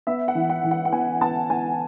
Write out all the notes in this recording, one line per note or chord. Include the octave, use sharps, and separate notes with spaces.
B3 E5
F#5
E3
F#5
E3
F#5
F#5
B3 G#5
B3 A5
B3 G#5